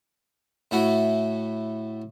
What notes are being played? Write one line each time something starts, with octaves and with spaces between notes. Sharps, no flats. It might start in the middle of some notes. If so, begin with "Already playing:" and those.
A2 A3 E4 F#4